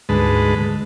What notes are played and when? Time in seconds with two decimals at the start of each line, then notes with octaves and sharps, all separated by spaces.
0.09 D2 G#2 G#3 B4 A5